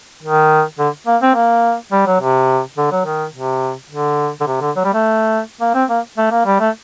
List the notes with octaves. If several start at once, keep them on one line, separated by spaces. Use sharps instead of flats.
D#3
D3
A#3
C4
A#3
G3
F#3
C3
D3
F#3
D#3
C3
D3
D3
C3
D3
F#3
G3
A3
A#3
C4
A#3
A3
A#3
G3
A3